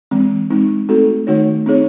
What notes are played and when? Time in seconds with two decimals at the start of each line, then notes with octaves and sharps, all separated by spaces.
0.11 E3 G#3 C4
0.50 G#3 C4 D#4
0.89 A3 C4 D#4 F#4 A4
1.27 D#3 A3 D#4 F#4 C#5
1.66 C4 D#4 G#4 C#5